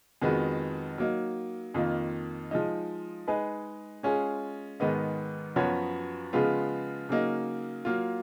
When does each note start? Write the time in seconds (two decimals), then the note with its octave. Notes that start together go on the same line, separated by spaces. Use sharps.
0.22 F2 D#3 G#3 B3 F#4
0.98 F#3 A#3 D#4
1.74 F2 D#3 A#3 F4
2.51 F3 G#3 D#4
3.28 G#3 D#4 G#4 B4
4.03 G#3 C#4 F4 G#4
4.80 G#2 D#3 G#3 B3 D#4
5.56 F#2 F3 B3 F#4 C#5
6.33 C#3 F3 G#3 B3 F4
7.09 C#3 F#3 A#3 D#4
7.85 F#3 A#3 F4